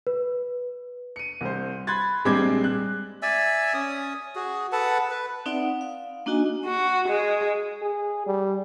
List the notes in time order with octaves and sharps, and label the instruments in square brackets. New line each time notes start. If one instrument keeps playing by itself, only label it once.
[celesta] B4
[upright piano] C#7 D#7
C2 C5
B5 C6 F#6 G#6 A6
A#1 G3 G#3 C4 D6 G#6
F#6
[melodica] D5 E5 G#5 E6
C#4 D#6
F#4 G#4
A4 B4 F#5 A5
B4
[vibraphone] C4 D#4 D5 E5 F#5
D#6
F5
A#3 D4 D#4 F#4 D#5 G#5
[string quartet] F#4
G#3
[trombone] G#4
G3